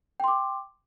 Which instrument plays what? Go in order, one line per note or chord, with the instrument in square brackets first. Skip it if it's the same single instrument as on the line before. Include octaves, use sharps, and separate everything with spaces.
[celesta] G5
C6
D6